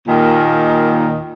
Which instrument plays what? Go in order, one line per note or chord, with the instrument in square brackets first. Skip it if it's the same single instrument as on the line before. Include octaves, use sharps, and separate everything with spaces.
[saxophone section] D#2 A#2 D#3